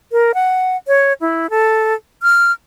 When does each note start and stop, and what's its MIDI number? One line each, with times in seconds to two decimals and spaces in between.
0.12 0.32 70
0.34 0.77 78
0.87 1.13 73
1.21 1.47 64
1.50 1.94 69
2.23 2.52 89